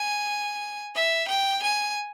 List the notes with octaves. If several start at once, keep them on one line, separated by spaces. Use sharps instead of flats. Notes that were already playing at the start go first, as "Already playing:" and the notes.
Already playing: G#5
E5
G5
G#5